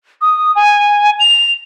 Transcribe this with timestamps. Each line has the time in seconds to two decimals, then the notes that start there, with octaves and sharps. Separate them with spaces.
0.21 D#6
0.55 G#5
1.20 F7